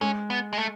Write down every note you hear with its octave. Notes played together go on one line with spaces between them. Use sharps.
G#3 C#4
B3
G#3
A3